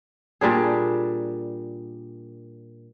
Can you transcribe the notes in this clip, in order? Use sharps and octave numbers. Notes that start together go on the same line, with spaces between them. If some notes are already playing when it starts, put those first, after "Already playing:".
A#2 G3 D4 G#4